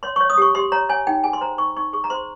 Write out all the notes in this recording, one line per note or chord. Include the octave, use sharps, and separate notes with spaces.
C#5 C6
C#6
C#5
D#6
G4 C#6
G4 C6
C#5 A#5
C#5 G#5
D#4 G5
G#4 G#5
C6
C5 A#5
D#4 C#6
D#4 C#6
G#4 C#6
A#5
C5 C6